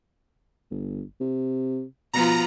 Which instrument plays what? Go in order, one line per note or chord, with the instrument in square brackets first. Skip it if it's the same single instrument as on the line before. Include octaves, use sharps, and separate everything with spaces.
[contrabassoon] G1
C3
[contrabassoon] B2 [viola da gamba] F3 B3 F4 [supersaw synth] A#5